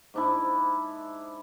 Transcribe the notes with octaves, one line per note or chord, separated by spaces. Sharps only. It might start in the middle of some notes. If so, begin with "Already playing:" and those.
G#2 D4 E4